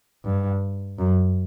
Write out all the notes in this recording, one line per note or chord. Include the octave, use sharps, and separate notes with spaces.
G2
F#2